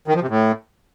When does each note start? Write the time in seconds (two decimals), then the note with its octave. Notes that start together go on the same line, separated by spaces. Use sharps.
0.08 D#3
0.15 F3
0.22 C3
0.29 A2